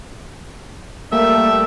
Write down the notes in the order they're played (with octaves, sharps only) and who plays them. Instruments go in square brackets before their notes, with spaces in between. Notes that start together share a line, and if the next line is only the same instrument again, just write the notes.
[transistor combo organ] G3 A3 [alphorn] A#3 [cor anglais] E5